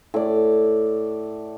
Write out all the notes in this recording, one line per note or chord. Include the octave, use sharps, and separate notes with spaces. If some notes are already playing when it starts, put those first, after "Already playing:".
A2 D5